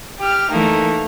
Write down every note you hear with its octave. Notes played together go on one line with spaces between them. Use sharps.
G4 F6
E3 A3 A#3 D#4